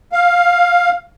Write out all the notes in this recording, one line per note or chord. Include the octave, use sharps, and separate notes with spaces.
F5